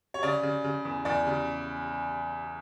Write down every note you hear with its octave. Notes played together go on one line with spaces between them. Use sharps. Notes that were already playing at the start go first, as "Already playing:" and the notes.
C#5
C#3 D5
C#3
C#3
E2
E2 D5
C#3